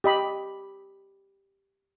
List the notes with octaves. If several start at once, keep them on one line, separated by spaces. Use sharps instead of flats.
G4 D#5 B5